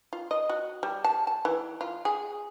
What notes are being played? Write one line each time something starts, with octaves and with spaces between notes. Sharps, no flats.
F4
D#5
F#4
G3
A5
A5
E3
F4
G#4